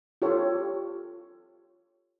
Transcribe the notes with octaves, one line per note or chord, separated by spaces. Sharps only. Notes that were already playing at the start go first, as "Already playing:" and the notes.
F4 G4 A4 C#5